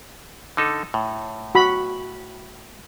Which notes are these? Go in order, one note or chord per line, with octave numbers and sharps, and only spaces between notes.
D3 D#4 A4
A2
F#4 B5